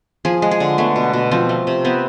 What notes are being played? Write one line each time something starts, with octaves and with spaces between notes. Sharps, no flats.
F3 G#4
G#3
G#4
D3
A3 B3
B2
B2
F3 C4
A3
C3
B3 C4